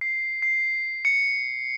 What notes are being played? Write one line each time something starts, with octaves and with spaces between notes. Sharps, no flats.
C7
C7
C#7